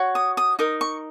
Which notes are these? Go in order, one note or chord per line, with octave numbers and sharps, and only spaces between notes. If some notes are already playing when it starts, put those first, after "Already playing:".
Already playing: F#4 C#5
D#6
D#6
D#4 A#4 D#6
C#6